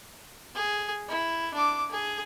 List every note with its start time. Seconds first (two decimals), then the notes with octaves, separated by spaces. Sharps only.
0.55 G#4
1.09 E4
1.54 D4 D6
1.91 G#4